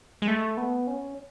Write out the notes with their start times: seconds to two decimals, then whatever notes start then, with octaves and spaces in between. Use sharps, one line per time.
0.22 G#3
0.28 A3
0.57 B3
0.87 C#4